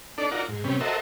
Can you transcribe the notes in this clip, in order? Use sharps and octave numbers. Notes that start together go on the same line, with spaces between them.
D4 D#4 A4 D5
D#4 F4 F#4 A#4 D5
G#2
C3 G3 B3 C#4
F#4 A4 A#4 C5 D#5 E5